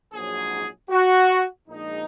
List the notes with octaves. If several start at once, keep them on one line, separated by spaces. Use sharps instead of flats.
A#1 G#2 F#3 G#4
F#4
A#1 A#2 G#3 D#4